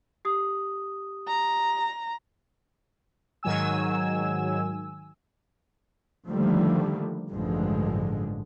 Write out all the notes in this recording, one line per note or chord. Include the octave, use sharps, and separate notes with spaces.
G4 D#6
A#5
G#2 D#3 F#3 G#5 E6
D3 D#3 F3 G3 A3 A#3
A1 G2 D3 F3 G#3